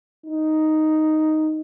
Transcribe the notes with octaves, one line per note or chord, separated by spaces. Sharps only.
D#4